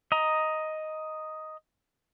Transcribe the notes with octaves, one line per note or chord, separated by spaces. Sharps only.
D#5 A#5